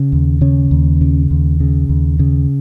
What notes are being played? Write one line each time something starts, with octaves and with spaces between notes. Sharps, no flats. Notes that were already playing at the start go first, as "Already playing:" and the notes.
Already playing: C#3
D#2
C#3 C#4
D#2
C#3
D#2
C#3
D#2
C#3